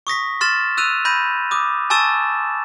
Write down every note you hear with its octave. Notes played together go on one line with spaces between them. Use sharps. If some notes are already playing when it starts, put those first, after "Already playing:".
C#6 D#6 A#6 B6
C6 F6 A6 E7
E6 F#6 D#7 F7
B5 G6 A#6 D#7
D6 D#6
G#5 A5 C#6 E6 A6 E7